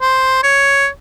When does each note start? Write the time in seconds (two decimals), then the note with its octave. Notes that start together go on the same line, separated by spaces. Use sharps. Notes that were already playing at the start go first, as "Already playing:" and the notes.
0.02 C5
0.43 C#5